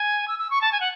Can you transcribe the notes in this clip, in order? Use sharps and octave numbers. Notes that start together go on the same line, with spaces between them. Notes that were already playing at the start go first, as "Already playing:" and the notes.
Already playing: G#5
E6
E6
C#6
A5
G#5
F#5